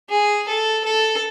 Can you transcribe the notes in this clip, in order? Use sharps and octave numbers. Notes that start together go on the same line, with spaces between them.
G#4
A4
A4